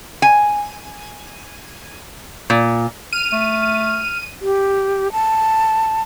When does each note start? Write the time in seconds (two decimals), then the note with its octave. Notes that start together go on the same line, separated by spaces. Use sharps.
0.22 G#5
2.50 A#2
3.13 F6 D#7
3.32 A3
4.40 G4
5.12 A5